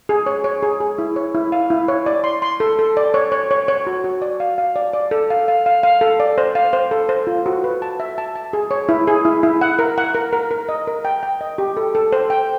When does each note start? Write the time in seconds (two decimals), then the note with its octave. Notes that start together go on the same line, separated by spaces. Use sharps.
0.09 G#4
0.26 C#5
0.44 C#5
0.63 G#4
0.80 G#4
0.98 E4
1.16 C#5
1.35 E4
1.52 F5
1.70 E4
1.88 C#5
2.06 D5
2.24 C6
2.42 C6
2.60 A4
2.79 A4
2.97 D5
3.14 C#5
3.32 C#5
3.51 C#5
3.68 C#5
3.87 F#4
4.04 F#4
4.22 D5
4.40 F5
4.58 F5
4.76 D5
4.93 D5
5.11 A4
5.30 F5
5.48 F5
5.66 F5
5.83 F5
6.01 A4
6.20 D5
6.38 C5
6.55 F5
6.73 C5
6.91 A4
7.09 C5
7.27 F4
7.46 F#4
7.64 B4
7.82 A5
8.00 E5
8.18 A5
8.36 A5
8.53 G#4
8.71 C#5
8.89 E4
9.07 G#4
9.25 E4
9.43 E4
9.61 F#5
9.79 A#4
9.98 F#5
10.15 A#4
10.33 A#4
10.51 A#4
10.69 D#5
10.87 A#4
11.05 G5
11.23 G5
11.41 D#5
11.58 G4
11.77 A4
11.95 A4
12.12 C5
12.30 G5